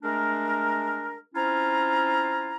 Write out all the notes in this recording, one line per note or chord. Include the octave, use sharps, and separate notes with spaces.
G#3 A3 D4 A#4
C4 C#4 E4 F4 A#5